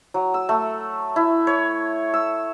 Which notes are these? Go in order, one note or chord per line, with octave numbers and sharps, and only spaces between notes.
F#3
E6
A3
E4
C#5
E6